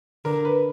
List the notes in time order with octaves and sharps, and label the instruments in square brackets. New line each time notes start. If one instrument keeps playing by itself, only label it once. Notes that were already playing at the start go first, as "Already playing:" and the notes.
[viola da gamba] D3 [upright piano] A#4
[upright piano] B4